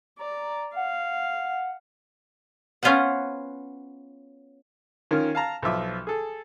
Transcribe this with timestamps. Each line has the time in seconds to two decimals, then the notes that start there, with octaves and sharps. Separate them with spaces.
0.19 D5 A#5
0.76 F5 F#5
2.83 B3 C#4 F4 B4 C5 F#5
5.11 D#3 C#4 F4 A#4
5.35 F5 A5 A#5
5.62 B1 F3 F4 E5 D6
6.07 G#4 A4